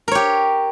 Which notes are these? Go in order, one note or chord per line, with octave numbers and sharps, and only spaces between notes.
G4 A#4 C#5